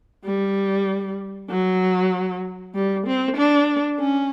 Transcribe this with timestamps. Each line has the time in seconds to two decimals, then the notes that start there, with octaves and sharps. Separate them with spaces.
0.25 G3
1.50 F#3
2.75 G3
3.06 C4
3.37 D4
3.99 C#4